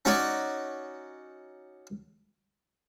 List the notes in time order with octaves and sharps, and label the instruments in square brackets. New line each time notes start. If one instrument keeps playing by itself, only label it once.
[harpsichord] C#4 D#4 F#4 C#5 D5